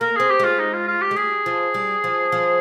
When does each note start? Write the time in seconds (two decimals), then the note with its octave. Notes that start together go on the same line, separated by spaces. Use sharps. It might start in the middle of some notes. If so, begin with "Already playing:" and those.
0.01 A#3 A#4
0.16 C4 G#4
0.30 G4
0.39 G#3 F4
0.59 D#4
0.73 F4
0.88 F4
1.02 G4
1.11 G#3
1.16 G3 G#4
1.46 F3
1.74 G3
2.04 F3
2.32 F3